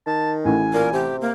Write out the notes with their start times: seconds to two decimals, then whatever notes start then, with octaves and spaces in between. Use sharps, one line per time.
0.07 D#3 A5
0.45 A1 A2 G#5
0.73 A#2 A#4
0.93 C3 G4
1.21 A#3